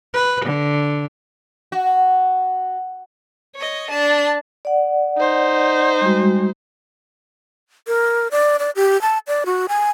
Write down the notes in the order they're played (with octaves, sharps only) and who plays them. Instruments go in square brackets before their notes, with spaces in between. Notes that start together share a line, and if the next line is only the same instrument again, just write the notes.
[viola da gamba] B4
D3
[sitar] F#4
[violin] C#5 D#5
D4 A5
[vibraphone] D5 F#5
[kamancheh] D#4 C5
[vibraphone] G3 G#3 F#4
[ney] A#4
D5
D5
G4
A5
D5
F#4
G#5